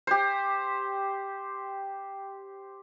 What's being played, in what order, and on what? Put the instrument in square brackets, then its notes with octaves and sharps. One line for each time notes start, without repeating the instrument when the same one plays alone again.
[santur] G4 C5